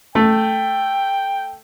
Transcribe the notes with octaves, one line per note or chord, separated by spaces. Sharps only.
A3 G5